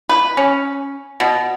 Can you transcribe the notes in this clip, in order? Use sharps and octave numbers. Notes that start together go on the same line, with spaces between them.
B4
C#4
B2